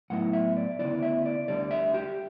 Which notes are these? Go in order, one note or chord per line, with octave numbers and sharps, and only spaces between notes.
A2 F#3 B3 E4 F#5
E5
D5
D2 C#3 E3 B3 E4 D5
E5
D5
D2 D3 G3 D5
E5
G4